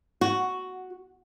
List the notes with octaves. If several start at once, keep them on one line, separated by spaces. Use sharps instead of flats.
F#4